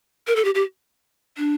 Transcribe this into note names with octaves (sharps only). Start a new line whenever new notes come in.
A#4
A4
G4
G4
D4